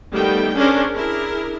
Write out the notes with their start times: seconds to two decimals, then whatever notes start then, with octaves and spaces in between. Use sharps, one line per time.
0.12 D#3 G3 A3 B3 G5
0.55 C#4 D4 G#4 A#4 C5
0.93 D4 E4 G#4 A#4